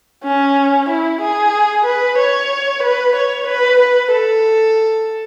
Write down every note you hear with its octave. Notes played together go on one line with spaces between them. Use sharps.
C#4
E4
G#4
B4
C#5
B4
C#5
B4
B4
A4